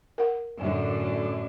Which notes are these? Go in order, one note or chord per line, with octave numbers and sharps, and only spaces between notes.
A#4 F#5
F#2 A2 D3